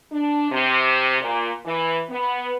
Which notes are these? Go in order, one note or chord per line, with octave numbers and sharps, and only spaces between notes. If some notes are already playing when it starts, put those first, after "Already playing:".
D4
C3
A#2
E3
B3